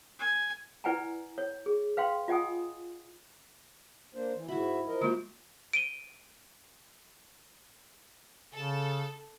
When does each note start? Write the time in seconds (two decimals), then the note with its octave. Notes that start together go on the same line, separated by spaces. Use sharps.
0.19 G#5
0.84 E4 B4 D5 F#5 G#5 A#5
1.38 C#5
1.66 G#4
1.97 B4 F5 G5 C6
2.28 F4 D#5 F#5 G#5 D#6
4.15 A#3 D4 C5
4.35 E3
4.48 G#2 E4 F#4 E5 B5
4.87 F3 A#4 D#5
5.01 G#3 A#3 F4 F#4 C5
5.73 D7 D#7 G7
8.54 C#3 A4